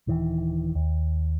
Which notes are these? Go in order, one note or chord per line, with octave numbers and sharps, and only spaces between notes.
D#1 D#3 E3
D#2